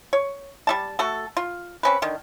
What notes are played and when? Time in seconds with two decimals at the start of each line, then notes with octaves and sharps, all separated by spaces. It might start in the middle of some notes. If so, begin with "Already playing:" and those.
0.13 C#5
0.67 G3 D#4 A5
0.99 A3 F#4 A4
1.37 F4
1.83 C4 C#4 B4
2.02 D3 D#3